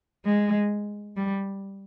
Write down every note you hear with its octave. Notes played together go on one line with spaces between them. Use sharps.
G#3
G3